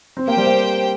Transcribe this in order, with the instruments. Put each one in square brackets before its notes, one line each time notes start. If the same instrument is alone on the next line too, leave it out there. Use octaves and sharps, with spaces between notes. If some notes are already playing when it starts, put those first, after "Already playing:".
[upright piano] C4
[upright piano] A#3 [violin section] G4 C5 G5
[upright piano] G3
A#3